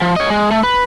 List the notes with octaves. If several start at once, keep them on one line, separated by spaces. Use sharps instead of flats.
F3
C#5 D#5
G#3
A3
B4